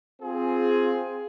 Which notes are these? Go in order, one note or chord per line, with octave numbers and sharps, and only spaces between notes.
C4 F4 G#4